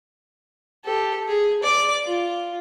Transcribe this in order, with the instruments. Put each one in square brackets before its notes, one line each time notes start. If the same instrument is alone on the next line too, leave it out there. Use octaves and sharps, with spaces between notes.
[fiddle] G4 A4
G#4
D5 D6
F4